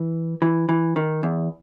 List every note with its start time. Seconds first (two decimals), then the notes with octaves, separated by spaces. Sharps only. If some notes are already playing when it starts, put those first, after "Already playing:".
Already playing: E3
0.42 E3
0.69 E3
0.96 D#3
1.23 E2